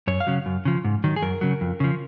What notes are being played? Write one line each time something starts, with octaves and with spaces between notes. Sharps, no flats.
F#2 C#5
F5
C#3 F#3
F#2
C#3 F3
G#2
D#3 F#3
G#4
F#2 A#4
C#3 F#3
F2
C#3 F3